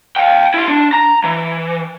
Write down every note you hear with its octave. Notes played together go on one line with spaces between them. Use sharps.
F5 G5
E4 C6
D4
A#5
E3